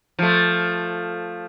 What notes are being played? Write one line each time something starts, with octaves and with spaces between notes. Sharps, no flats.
F3 A3